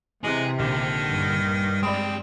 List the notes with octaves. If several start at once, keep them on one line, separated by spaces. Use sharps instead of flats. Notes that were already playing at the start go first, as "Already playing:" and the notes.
C3 E3 G#3 G#4 F#6
A#1 D3 D#3 G4
G2
G3 G#3 C4 D5 B5 D#6